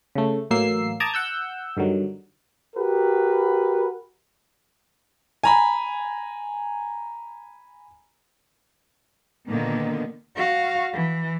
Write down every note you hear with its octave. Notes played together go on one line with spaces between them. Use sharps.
C#3 A3
A2 E3 F#3 A#3 E6 C7
A5 A#5 D6 D#6 G#6
F#5 E6 G6
G2 D3 D#3 F#3
F#4 G4 A#4 B4
G#5 A#5 B5
A#2 D3 D#3 A#3 B3
F#4 F5
E3